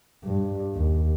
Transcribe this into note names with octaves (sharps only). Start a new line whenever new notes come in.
G2
D#2